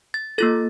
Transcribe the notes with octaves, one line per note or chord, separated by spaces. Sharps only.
A6
A#3 F4 A4 A6